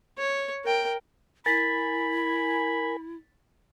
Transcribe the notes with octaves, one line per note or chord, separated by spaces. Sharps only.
C#5
A#4 G5
E4 A#4 G#5 B5 A6 B6